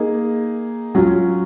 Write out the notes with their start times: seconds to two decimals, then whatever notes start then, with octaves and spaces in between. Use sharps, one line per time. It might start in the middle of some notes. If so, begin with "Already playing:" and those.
Already playing: A#3 D#4 G#4
0.95 F#3 C#4 F4